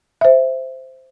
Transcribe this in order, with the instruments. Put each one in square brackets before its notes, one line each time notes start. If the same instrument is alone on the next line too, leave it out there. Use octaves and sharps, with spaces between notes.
[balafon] C5 E5